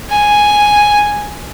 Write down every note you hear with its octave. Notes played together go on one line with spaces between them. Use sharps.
G#5